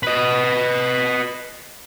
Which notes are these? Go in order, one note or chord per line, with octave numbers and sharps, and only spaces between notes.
B4 D#5